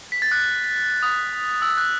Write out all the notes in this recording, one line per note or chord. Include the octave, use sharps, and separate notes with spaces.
B6
A6
F#6
D#6
E6
F#6